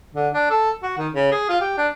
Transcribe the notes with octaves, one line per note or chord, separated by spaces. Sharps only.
D3
D4
A4
F#4
D#3
C#3
G#4
F4
G4
D4